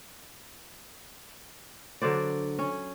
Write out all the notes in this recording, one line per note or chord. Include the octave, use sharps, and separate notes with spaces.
D3 F#3 C5 D5
C#4